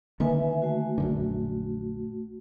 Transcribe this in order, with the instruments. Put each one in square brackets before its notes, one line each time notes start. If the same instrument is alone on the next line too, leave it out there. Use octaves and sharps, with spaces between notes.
[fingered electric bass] D3 D#3 A#3 [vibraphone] B4 E5 G#5
[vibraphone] A3 F#4
[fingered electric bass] A#1 F#2 D3